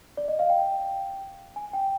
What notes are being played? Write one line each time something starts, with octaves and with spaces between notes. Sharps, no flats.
D5
D#5
F5
G5
G#5
G5